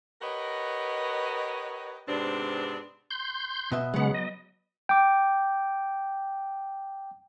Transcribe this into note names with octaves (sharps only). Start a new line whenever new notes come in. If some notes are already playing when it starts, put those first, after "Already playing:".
G4 A#4 B4 C#5 D#5 F#5
G#2 C3 B3 C4 D4
C6 G6
B2 B3 E5
C#3 F#3 G#3 B3 F#5
D#5
G5 D6